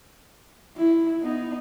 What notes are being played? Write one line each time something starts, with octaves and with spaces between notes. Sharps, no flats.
E4
B3 D#4